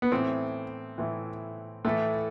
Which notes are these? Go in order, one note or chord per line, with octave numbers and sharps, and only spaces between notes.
B3
A2 E3 C4
A2 E3
A2 E3 A3